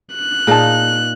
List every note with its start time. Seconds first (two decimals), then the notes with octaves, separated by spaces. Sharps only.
0.14 F#6
0.47 A#2 D#4 G#4 A5